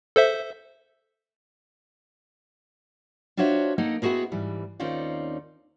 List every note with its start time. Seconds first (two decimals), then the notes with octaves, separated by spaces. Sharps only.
0.16 A4 C5 E5
3.37 D4 F4 F#4 C5 C#5 E5
3.78 A#3 D#4 A4 D#5 F#5
4.02 B3 C4 E4 F#4 G#4 A#4
4.32 G#2 E3 G3
4.80 D#2 C4 C#4 D#4 F4 D5